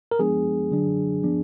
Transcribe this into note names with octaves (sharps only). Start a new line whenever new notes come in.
A#4
F3 G#3 B3 D4 G#4
D3 F#3 D4
F3 B3 D4